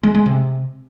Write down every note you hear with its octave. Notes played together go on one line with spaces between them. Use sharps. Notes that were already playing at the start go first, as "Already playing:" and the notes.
G#3
G#3
C3